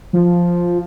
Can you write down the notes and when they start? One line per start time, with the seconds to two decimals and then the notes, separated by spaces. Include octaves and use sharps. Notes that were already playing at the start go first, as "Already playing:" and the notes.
0.13 F3